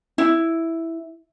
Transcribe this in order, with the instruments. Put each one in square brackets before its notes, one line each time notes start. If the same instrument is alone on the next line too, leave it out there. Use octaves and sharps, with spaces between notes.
[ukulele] E4